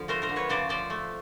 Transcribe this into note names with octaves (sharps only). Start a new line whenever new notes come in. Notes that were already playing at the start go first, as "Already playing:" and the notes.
Already playing: D3 F3
A3 A#4 C5
A#4 C5
D3
B4 C#5
C#3 C5 D5
F3 C5 D5
A3